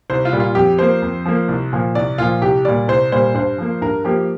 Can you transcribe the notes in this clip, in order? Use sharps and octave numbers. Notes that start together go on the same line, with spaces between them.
C2 C5
F4
A#2 G3 A#3
F4
F2 G4
F3 A#3 C5
F2
F3 A#3
C2
A#2 F3
C2 D5
A#2 F3 F4
C2 G4
A#2 G3 D5
C2 C5
A#2 G3 C5
G2 C5
F3 A#3
G2 A#4
F3 A#3 G4